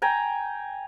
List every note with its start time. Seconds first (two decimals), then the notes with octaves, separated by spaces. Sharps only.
0.02 G5 G#5 A#5